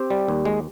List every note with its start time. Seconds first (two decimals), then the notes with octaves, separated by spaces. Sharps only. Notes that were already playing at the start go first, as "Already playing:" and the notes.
Already playing: C4 G4
0.10 G3
0.28 D#2
0.45 G#3